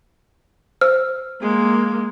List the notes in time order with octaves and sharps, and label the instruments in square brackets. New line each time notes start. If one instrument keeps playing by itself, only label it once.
[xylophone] C5 E6 F6
[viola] G#3 [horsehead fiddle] A#3